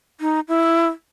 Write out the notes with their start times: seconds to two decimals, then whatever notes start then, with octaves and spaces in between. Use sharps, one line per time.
0.21 D#4
0.48 E4